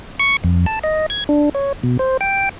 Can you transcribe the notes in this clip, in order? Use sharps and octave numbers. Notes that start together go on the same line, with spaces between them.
C#6
F2
A5
D#5
G#6
D4
C#5
B2
C5
G5